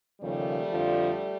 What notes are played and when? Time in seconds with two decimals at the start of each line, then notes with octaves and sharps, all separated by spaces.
0.20 D#2 C#3 F3 G3 A3
0.70 F2 D3 F3